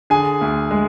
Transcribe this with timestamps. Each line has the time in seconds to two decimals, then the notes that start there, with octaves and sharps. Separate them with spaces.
0.10 D3 G#4 G#5
0.41 D2
0.71 G#3